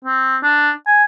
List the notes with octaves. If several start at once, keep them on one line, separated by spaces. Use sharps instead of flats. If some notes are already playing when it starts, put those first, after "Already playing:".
C4
D4
G#5